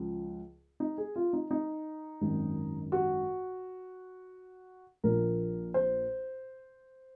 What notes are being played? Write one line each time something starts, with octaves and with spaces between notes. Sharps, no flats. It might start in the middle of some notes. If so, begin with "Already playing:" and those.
Already playing: C#2 C#3 F3
D#4
G#4
F4
D#4
D#4
G#1 F#2 D#3
F#4
A#1 A#2 F3 A#4
C5